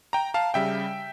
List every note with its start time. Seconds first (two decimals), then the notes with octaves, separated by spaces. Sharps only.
0.13 G5 A#5
0.34 F5 A5
0.54 C#3 G3 E5 G5